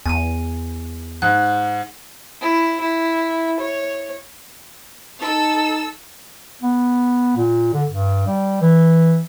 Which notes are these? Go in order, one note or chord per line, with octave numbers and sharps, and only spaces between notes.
E2 G#5 D#7
G#2 F#6
E4
E4
C#5
D#4 A4 E6
B3
A#2
D3
G2
G3
E3